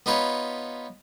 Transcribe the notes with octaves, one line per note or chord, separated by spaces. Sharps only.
B3 D#4 F4 B4 C#5